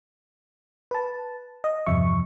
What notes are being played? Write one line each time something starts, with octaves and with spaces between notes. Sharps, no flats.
B4 A5
D#5
E2 G2 C3 F3 E5 C#6